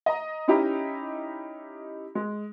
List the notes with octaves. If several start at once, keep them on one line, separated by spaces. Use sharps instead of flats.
D#5 A#5
C#4 D#4 E4 G4 D#5 A#5
G#3